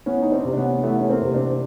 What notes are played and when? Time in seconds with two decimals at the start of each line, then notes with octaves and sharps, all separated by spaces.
0.06 E3 B3 C#4
0.22 D#4
0.32 C4 D4
0.45 C3
0.53 D4
0.57 B3 C#4
0.83 E3 A3 B3
1.00 C#4
1.09 A#3 C4
1.22 C3
1.34 C4 D4